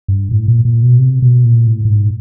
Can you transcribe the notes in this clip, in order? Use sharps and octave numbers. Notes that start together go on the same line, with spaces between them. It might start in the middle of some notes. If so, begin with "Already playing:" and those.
G2
A2
A#2
A#2
B2
C3
B2
A#2
A2
A2
G#2